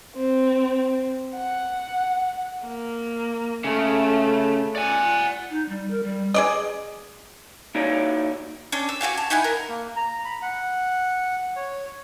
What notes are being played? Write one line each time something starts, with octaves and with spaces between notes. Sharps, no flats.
C4
F#5
A#3
C#3 A3
D5 F#5 G#5
D#4
G3
A#4
G3
G#4 D5 D#5
A#3 D#4 E4 F#4 C#5 D5
C#4 D4
E6
F#4 G4 F5 G#5
A5
D#4 E4 F#5 G#5
A#4
A#3
A#5
B5
F#5
C#5